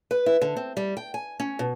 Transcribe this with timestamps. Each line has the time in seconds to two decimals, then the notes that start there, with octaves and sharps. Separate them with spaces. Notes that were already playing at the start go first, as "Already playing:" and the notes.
0.11 B4
0.26 E4
0.41 D3
0.56 C4
0.77 G3
0.97 G5
1.14 G#5
1.40 C#4
1.59 B2